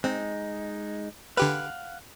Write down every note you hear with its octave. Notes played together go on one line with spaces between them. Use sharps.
G#3 C4 D#4
D3 G4 B4 F5 F#5